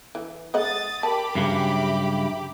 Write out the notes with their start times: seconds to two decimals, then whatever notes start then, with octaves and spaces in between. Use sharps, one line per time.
0.15 E3
0.54 G#3 D#5 F#5 D#6 A6
1.03 G4 A#4 A5 B5 D6
1.35 G2 C#3 F#3 E5